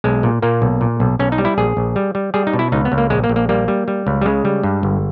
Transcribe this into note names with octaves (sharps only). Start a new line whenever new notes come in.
B1 G#3
A#2
A#2 A#3
B1
A#2
B1
B1 C#4
D#4
G3
E4
A#1 G#4
A#1
G3
G3
G3 G#4
D#4
B2
E4
C#2 D#4
B3
C#2
A#3
A#1 G#3
A#3
A#1
A#3
G3 A#3
G3
G3
C#2
G3
C#3 G#3
G3
G2
G1